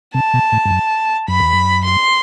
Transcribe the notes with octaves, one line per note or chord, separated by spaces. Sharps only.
C3 A5
B2
A2
G2
F#2
F#2 B5
E2
F#2
C6